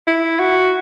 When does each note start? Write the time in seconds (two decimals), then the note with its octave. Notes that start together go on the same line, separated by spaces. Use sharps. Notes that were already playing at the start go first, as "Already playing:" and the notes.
0.07 E4
0.40 F#4